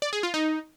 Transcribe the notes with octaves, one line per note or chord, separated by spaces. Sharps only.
D5
G#4
F4
D#4